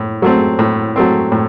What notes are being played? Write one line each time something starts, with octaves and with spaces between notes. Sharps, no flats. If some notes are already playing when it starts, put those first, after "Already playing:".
Already playing: A2
F#3 A3 C4
A2
F#3 A3 C4
A2